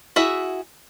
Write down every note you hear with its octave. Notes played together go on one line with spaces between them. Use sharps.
E4 F#4 G#4 E5